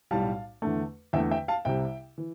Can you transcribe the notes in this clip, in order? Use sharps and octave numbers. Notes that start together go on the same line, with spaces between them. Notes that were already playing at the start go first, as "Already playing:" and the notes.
B1 A2 G3 F5 A5
E2 D3 A3
E2 D3 A3 E5 G5
E5 G5
F5 A5
C2 C3 G3 E5 G5
E3